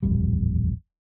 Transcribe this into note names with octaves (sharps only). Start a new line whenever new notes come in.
D#1 A1 F2 G3